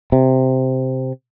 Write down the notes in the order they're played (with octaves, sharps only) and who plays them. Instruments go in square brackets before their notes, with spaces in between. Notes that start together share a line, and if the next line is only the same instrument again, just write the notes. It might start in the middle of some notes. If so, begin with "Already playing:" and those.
[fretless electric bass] C3